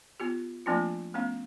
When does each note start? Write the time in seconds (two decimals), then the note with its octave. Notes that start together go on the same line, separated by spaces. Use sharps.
0.20 B3 F4 G4
0.66 F3 A3 A#3 C4 D4 F4
1.14 A3 B3 C#4 F5